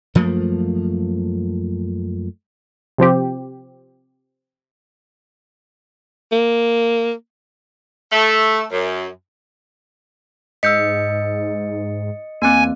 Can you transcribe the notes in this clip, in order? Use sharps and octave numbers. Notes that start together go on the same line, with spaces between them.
F#2 F3 A3 A#3
C3 F3 C4 G4
A#3
A3
F#2
G#2 D#5 E6 G6 B6 C#7
E2 A#3 C4 G#5